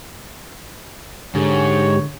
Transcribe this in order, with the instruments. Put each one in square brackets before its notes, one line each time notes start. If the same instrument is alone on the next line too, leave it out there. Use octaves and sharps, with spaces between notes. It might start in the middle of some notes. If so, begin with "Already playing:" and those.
[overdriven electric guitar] G#2 [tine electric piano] D3 [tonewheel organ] G#3 G4 [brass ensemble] C#5